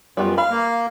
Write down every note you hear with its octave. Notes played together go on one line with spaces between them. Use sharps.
F#2 G3 B3 F4
F5 B5
A#3